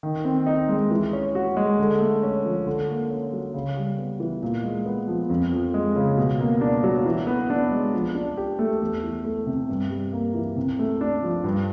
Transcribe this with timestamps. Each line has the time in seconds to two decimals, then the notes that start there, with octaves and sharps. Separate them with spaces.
0.03 D#3
0.25 C4
0.46 D#4
0.68 G#3
0.91 E3
1.13 C#4
1.35 F#4
1.57 G#3
1.79 D3
2.00 A3
2.23 C#4
2.44 F3
2.66 D3
2.89 A#3
3.10 C#4
3.33 F#3
3.54 C#3
3.77 G3
3.98 B3
4.20 E3
4.43 A#2
4.63 G#3
4.86 B3
5.08 F3
5.30 F2
5.51 F3
5.74 G#3
5.96 C#3
6.17 B2
6.39 A#3
6.61 D4
6.84 F#3
7.06 E3
7.27 B3
7.50 D4
7.71 G#3
7.94 F3
8.15 D4
8.37 G4
8.59 A3
8.80 E2
9.03 E3
9.25 A3
9.47 C3
9.69 G2
9.90 G3
10.13 A#3
10.34 E3
10.56 C3
10.79 A3
11.01 D4
11.23 F3
11.44 G2